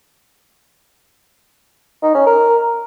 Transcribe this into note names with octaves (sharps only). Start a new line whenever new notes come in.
D#4
C#4
A#4